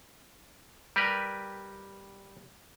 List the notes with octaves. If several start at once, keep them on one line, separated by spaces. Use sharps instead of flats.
G3 G4 A#4 B4